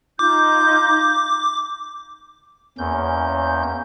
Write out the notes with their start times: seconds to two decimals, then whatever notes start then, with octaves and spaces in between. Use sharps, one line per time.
0.19 D#4 F4 D6 G6
2.78 E2 A#3 C#4 G6